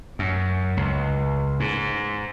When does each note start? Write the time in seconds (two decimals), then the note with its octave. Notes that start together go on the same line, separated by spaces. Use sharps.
0.19 F#2
0.77 C#2
1.60 G#2